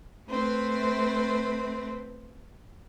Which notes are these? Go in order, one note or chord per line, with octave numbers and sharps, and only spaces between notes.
A3 C4 B4